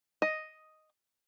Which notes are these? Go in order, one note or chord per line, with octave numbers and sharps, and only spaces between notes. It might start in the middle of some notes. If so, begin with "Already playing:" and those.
D#5